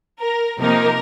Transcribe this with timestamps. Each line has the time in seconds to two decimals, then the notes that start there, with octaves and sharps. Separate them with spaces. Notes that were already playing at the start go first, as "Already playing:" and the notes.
0.20 A#4
0.59 C3 F3 A#3 D#4 A#4